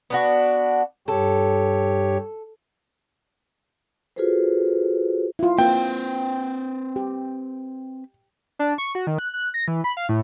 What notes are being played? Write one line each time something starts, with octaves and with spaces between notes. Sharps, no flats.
B3 D4 F#4
G2 G4 A4 C#5
F4 F#4 G#4 A4 B4 C5
E4 F4
A#3 C4 F4 B4 C5 G5
G4
D4
C#6
F#4
D#3
F#6
F#6
A#6
E3
B5
F5
A2